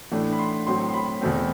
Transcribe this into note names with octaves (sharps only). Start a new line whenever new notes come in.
A2 E3 A3 D4
B5
C6
A2 F#3 C4 C6
C6
B5
E2 B2 A3 C4